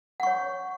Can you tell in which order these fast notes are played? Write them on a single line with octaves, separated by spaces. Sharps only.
F#5 C#6 C#5